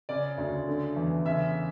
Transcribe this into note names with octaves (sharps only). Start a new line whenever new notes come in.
C#3 D5
D2
D3
E2
C#3 E5